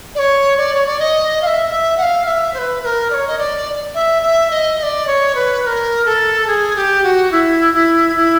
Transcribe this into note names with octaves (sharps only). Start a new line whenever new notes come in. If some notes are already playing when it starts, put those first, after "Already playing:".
D5
C#5
D5
C#5
D5
D#5
F5
E5
E5
F#5
F5
E5
C5
B4
B4
A#4
D5
C#5
D#5
D5
E5
E5
D#5
D#5
D5
C#5
B4
B4
A#4
A4
G#4
G4
F#4
E4
E4
E4